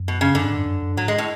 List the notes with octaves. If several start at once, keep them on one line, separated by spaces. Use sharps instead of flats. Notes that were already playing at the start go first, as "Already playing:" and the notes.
Already playing: F#2
B2
C#3
F#2 D3
G#2
F#2
F#2
F#2
G#2 F#3
G#3
A2